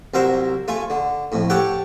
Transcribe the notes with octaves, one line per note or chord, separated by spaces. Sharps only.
C2 F#3 A#4 C5 E5
A3 F4 G#5
D3
F2 A2
G4 A4 C#5 F#5 G5